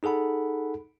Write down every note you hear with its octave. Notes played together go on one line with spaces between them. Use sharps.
D#4 G#4 A4 F#5 B5